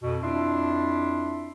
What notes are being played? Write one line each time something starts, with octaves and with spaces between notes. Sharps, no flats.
F2 B2
F2 D4 E4 F4 E5 C6